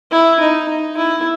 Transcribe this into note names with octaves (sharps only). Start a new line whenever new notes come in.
E4
D#4
D#4
E4